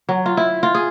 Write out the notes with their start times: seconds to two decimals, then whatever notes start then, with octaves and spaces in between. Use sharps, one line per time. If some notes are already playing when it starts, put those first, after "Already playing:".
0.09 F#3
0.26 F4
0.37 E4
0.63 F4
0.75 G#4